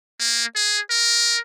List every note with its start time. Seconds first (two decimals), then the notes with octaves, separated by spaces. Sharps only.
0.20 A#3
0.55 G#4
0.90 A#4